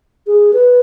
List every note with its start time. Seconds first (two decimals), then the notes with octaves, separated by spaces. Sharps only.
0.27 G#4
0.53 B4